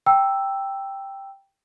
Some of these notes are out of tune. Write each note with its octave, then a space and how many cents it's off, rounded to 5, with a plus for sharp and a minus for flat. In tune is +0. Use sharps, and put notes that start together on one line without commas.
G5 +0 A#5 +0 E6 +0